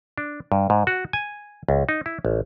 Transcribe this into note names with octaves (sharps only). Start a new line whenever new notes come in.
D4
G2
G#2
F#4
G#5
C#2
D#4
E4
A1